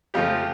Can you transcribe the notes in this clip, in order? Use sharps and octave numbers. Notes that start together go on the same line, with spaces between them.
F2 C#3 F3 A3 F4 G4